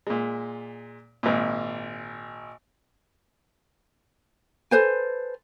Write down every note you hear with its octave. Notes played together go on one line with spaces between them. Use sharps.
A#2 G#3
G#1 A#2
A4 B4 C5 G#5